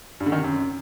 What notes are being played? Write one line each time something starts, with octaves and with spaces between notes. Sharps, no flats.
G2
D3
D#3
C3
F#2